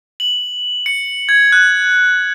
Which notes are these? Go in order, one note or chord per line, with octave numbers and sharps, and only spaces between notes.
F#7
C#7
G#6
F#6